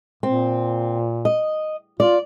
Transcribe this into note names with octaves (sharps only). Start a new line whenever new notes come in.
A#2 C4
D#5
F4 D5